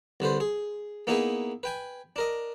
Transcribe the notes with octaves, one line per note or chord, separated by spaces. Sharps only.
C2 D3 B4 C5
G#4
A#3 B3 D#4 E4 G#4 B4
B4 G5 G#5
D4 A#4 D#5